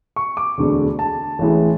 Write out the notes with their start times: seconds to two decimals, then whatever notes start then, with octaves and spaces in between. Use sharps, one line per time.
0.16 C#6
0.37 D6
0.58 E1 D2 D3 G#3
0.99 A5
1.39 A1 A2 E3 G#3